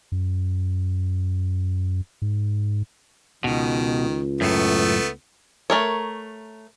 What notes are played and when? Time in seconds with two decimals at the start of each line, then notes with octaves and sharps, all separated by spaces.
0.12 F#2
2.22 G#2
3.44 C#2 B2 D#3
4.41 F#2 A2 A3 B3
5.70 A3 A#4 C#5